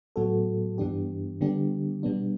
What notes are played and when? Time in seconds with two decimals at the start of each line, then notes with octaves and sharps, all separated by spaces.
0.16 A2 F#3 B3 F#4 A4
0.78 G2 E3 B3 D4 G4
1.41 D3 G3 B3 D4 G4
2.03 B2 G3 B3 D4